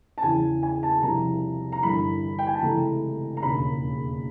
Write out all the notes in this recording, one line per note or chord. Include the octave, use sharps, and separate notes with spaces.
A5
E2 C#3 E3 G#5
G#5
A5
C2 C3 F3 A#5
A#5
G1 G2 E3 B5
G5
G#5
A5
C#2 C3 E3 A3 A#5
A#5
E1 D#2 C#3 B5